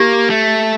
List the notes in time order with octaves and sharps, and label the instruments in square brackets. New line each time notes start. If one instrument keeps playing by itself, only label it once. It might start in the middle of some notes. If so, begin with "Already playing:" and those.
Already playing: [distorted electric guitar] A#3 [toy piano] G4
[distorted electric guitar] A3